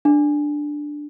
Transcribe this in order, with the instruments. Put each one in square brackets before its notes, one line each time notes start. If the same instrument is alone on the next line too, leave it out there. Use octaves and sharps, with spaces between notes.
[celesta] D4